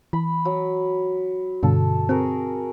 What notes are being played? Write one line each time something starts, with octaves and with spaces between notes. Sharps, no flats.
E3 B5
F#3
G2 B2 D3 A4
C4 F#4 G#4 A#4